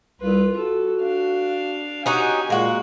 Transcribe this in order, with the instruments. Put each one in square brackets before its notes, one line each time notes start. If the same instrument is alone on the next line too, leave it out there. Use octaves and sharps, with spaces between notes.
[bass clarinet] C2 [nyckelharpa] F4 B4
[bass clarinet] F#4 [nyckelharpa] A4
[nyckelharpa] D4 F5
[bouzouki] C#4 D#4 F#4 [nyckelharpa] G4 G#5
[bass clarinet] A#2 [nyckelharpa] G#3 [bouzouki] A#3 F#4